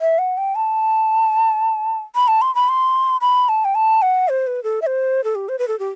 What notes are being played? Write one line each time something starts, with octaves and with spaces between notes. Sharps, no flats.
E5
F#5
G5
A5
B5
A5
C6
B5
C6
B5
A5
G5
A5
F#5
C5
B4
A4
E5
C5
A4
G4
C5
B4
A4
G4